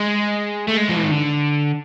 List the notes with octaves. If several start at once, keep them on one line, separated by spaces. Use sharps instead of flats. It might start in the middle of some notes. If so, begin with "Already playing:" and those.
Already playing: G#3
A3
G#3
F3
E3
D#3
D3